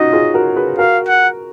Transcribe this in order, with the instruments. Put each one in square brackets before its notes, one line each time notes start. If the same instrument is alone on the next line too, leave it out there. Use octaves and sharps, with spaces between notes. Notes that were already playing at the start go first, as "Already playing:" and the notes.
Already playing: [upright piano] C#4 D#4 F4 F#4 [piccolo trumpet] D#5
[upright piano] F4 G#4
F#4 A#4
G#4 B4
[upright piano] F#4 A#4 [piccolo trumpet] F5
[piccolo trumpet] F#5